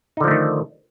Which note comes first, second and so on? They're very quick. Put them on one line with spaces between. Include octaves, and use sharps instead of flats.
D#4 D3 F3 A3 D#3